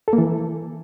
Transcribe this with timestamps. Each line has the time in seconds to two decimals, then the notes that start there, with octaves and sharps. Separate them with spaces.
0.08 A4
0.13 A#3
0.18 E3